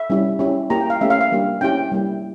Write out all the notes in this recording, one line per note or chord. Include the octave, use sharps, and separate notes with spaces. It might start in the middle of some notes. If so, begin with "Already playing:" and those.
Already playing: E5
G3 C#4 E4
C#4 E4 G4
A#3 E4 G4 A#5
G5
F5
A3 C#4 G4 E5
F5
F5
G3 A#3 D4 G4
C#4 E4 G4 G5
G3 A#3 E4